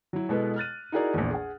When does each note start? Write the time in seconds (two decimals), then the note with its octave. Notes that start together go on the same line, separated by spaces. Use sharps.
0.13 F#3 E4
0.29 B2 G#3 B3 E4 A4 B4
0.56 F6 F#6 A6 D#7
0.92 D#4 E4 F#4 G#4 A#4 D5
1.14 A#1 E2
1.31 G#4 F#5